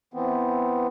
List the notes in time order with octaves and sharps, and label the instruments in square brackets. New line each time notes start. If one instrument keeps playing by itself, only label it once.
[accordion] E3 B3 C4